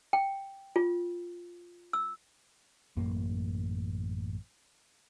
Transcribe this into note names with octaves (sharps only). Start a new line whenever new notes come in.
G5
F4
E6
A1 F#2 A#3